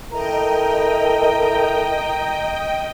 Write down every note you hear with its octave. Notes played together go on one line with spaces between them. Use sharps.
E4 A4 A#4 D#5 G5 A#5